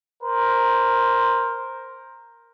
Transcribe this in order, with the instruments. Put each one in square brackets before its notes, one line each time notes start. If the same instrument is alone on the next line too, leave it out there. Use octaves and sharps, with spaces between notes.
[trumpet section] A#4 C5